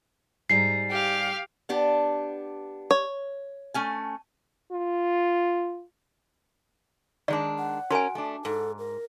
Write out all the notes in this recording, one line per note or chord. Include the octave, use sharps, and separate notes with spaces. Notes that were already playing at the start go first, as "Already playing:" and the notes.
G#2 G3 A#5 C7
G4 F5
B3 D4 G4
C#5
A3 C#4 G#5
F4
D#3 G#3 D4 D5
F#5
C#4 F#4 A#4 G#5
A3 D4
G#2 A4
A#4